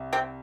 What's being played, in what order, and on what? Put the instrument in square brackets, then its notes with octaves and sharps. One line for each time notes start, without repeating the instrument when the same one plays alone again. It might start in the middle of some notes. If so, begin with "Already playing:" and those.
Already playing: [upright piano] C2
[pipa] C3 C4